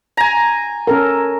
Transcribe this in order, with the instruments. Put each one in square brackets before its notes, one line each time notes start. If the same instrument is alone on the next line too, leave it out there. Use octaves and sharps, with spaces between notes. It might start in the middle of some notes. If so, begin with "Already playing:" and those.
[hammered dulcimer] G#5 A#5
[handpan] C#4 A4 A#4